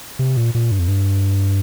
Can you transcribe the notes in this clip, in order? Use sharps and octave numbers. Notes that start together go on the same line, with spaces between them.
C3
A#2
A#2
G2
F2
G2